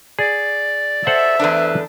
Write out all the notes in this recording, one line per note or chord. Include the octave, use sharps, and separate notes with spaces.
G#4 D5
A4 C5 E5 F#5
E2 A3 D4 B4